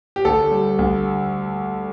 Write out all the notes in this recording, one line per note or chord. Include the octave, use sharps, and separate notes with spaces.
G4
D2 A4
G3
D2